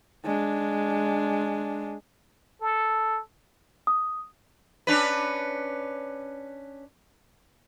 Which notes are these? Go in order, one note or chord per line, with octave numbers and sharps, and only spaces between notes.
G#3 D4
A4
D#6
C#4 D4 B4